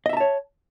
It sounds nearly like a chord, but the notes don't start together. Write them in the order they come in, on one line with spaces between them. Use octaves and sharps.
D#5 E5 A#5 A5 C#5